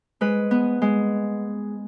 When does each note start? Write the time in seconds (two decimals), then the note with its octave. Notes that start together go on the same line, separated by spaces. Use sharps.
0.21 G#3 B4
0.51 B3
0.82 G#3